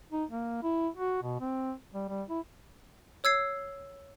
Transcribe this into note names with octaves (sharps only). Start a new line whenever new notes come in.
D#4
A#3
E4
F#4
B2
C4
G3
G3
E4
C#5 E6 G#6 C7